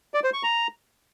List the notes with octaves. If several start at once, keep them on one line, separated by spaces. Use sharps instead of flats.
D5
C5
C#6
A#5